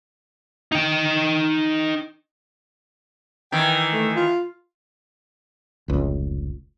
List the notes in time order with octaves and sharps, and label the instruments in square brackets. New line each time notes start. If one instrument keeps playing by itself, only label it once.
[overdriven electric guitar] D#4 G5
[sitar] D#3 E3 [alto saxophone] G5
[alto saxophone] A3
F4
[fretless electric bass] F1 C#2